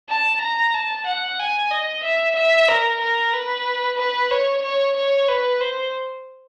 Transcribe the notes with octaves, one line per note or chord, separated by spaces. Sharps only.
A5
A#5
A5
F#5
G#5
D#5
E5
E5
A#4
A#4
B4
B4
C#5
C#5
C#5
B4
C5